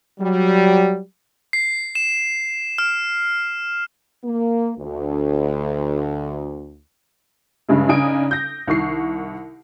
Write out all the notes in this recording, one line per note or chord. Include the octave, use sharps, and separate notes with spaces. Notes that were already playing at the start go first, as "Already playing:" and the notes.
F#3 G3
C7
E7
F6
A#3
D2
G2 C#3 G#3 E4
C#3 D4 D#4 G#5 D#6 D7
G6 A#6
C2 D#3 C#6 C7